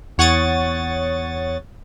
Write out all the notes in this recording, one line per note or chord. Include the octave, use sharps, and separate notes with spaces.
E2 C#5 F#5 C#6 D#6 A6